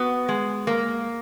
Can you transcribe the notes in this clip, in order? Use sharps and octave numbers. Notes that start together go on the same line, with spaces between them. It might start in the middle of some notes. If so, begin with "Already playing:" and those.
Already playing: B3 F#4
G#3
A#3